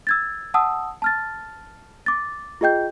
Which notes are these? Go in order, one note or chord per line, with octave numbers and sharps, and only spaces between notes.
E6 G#6 A6
F#5 A5 D#6 E6
A5 F6 A6
D6 A6
F4 G#4 D#5 G5 G6